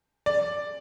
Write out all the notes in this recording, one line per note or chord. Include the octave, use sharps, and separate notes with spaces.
D5